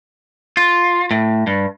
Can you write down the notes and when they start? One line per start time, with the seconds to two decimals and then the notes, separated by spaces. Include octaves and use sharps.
0.57 F4
1.11 A2
1.47 G2